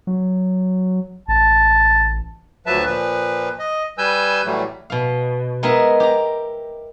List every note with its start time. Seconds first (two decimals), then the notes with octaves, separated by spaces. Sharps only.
0.07 F#3
1.28 A1 A5
2.66 D2 F3 F#3 B4 E5 A5
2.85 A#2 F3 B4
3.59 D#5
3.98 G3 B4 G#5 E6 G6
4.45 A2 E3 F#3 G3 A3
4.90 B2 F5
5.63 G#3 B3 A#4 D#5 E5
6.00 G4 A#5